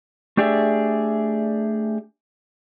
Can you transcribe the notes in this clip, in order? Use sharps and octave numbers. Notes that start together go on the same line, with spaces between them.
A3 D4 G4 G#4 D5 E5